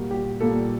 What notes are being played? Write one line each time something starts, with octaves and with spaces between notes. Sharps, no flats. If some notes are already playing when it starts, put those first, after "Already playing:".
Already playing: A#2 G3 A#3 F#4
G4
A#2 G3 A#3 A4